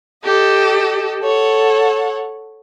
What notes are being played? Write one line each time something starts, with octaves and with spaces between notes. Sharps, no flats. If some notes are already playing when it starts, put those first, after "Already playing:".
G4 A4 D#5
A4 C#5 F#5